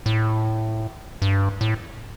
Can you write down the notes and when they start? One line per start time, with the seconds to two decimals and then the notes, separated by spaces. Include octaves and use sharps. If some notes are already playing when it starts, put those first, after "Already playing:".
0.06 A2
1.22 G2
1.61 A2